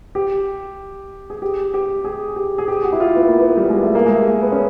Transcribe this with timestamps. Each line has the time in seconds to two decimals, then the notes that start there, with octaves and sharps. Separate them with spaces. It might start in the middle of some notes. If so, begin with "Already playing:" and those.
0.15 G4
1.30 G#4
1.42 G4
1.74 G4
2.05 G#4
2.36 G4
2.58 G#4
2.68 G4
2.83 F#4
2.93 E4
3.00 F4
3.16 B3
3.27 A#3
3.40 B3
3.57 G3
3.70 G#3
3.83 A3
3.95 A#3
4.06 G#3
4.10 A3
4.27 A#3
4.42 B3
4.52 C#4